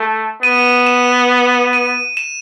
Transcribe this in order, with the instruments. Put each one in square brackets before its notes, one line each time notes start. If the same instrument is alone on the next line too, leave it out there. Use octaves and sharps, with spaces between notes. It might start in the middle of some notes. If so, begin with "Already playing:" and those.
Already playing: [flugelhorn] A3
[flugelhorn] B3 [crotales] D#7
[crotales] E7
D#7
E7